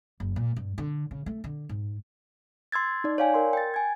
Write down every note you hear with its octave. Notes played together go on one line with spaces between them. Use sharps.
F#1
A#2
G2
D3
C#3
A3
D3
G#2
C6 E6 G#6 A6
D#4 D5
C#5 D5 F5 G5 G#5
A#4 C6
G5 A6
G#5 G#6